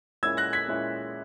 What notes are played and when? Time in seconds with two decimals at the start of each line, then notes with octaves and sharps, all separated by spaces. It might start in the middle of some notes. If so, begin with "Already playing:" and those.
0.23 A#2 G#3 C#4 E4 E6 G#6
0.37 F#6 A#6
0.53 G#6 B6
0.68 A#2 G#3 C#4 E4